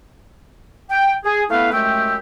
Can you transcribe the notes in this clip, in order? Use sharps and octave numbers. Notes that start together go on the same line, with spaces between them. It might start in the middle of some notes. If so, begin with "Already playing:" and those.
G5
G#4
A3 B3 E4 B4 F5
F#2 G#3 A3 G4 G5 E6